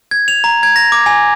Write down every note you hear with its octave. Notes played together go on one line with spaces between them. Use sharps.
G#6
F7
A#5
G#6
A#6
D6
G#5